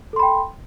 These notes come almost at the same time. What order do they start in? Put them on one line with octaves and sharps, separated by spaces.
A4 C6 B5 G5